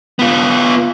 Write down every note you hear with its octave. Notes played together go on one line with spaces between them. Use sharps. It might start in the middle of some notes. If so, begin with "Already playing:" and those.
B3 F4